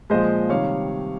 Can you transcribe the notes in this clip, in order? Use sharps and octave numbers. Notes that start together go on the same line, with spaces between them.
A#2 F3 G#3 C5 D#5
C3 D#3 G3 C#5 F5